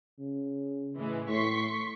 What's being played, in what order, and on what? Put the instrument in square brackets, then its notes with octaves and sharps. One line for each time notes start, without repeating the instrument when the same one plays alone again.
[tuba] C#3
[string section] A2 E3 G#3
[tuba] A2 [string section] C6 C#6 B6